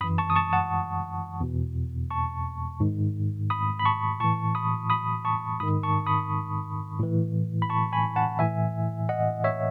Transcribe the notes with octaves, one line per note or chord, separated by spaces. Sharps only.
F#2 E3 B5 D#6
A5 C#6
D#6
A5 C#6
F#5 A5
E2 B2
A5 C#6
G#2 D#3
B5 D#6
B5
A5 C#6
A2 E3 A5 C#6
B5 D#6
B5 D#6
A5 C#6
G#2 D#3 B5 D#6
A5 C#6
B5 D#6
A2 E3
B5
A5 C#6
G#5 B5
F#5 A5
A2 E3 E5 G#5
D#5 F#5
C#5 E5